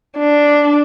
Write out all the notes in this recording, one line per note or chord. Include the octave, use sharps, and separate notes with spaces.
D4